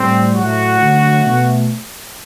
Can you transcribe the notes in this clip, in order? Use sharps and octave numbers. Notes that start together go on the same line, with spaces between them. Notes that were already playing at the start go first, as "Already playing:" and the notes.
Already playing: A2 G3 C4
A2 F#3 A3 F#4
D3 F#3 A3
B2 A3